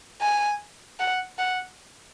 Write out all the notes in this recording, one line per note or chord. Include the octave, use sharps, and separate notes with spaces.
G#5
F#5
F#5